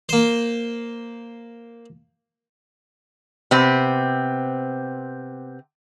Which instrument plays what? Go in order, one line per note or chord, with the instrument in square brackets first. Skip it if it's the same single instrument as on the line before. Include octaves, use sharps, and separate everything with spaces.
[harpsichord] A#3 C5
[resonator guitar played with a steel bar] C3 B3 C4